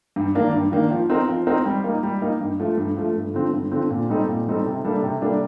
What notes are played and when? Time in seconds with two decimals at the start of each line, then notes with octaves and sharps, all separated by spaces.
0.16 G2
0.35 D#3 A#3 D4
0.53 G2
0.72 D#3 A#3 D4
0.91 F3
1.10 C4 D#4 A#4
1.28 F3
1.47 C4 D#4 A#4
1.65 G3
1.84 A#3 D#4
2.03 G3
2.22 A#3 D#4
2.41 G2
2.60 F3 A3
2.77 G2
2.97 F3 A3
3.15 G2
3.34 D3 F3 C4
3.53 G2
3.71 D3 F3 C4
3.90 A#2
4.09 G3 C4 D#4 A4
4.28 A#2
4.47 G3 C4 D#4 A4
4.66 C3
4.84 G3 A#3 D4 A4
5.03 C3
5.22 G3 A#3 D4 A4